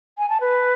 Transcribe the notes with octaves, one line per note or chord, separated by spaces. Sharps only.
G#5
A5
B4